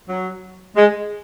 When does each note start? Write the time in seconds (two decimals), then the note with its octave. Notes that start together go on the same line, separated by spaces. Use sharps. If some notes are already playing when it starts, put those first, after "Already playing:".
0.09 F#3
0.75 G#3